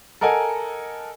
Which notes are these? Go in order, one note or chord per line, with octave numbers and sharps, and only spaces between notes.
A4 A#4 D#5 F#5 G#5